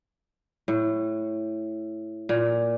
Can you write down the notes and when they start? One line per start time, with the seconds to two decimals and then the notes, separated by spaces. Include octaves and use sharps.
0.68 A2
2.29 A#2